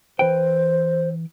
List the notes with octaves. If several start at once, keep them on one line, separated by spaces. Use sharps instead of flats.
E3 B4 C5 G5